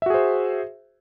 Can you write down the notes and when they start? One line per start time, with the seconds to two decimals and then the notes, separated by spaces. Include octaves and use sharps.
0.02 E5
0.06 F#4
0.10 G#4
0.14 C5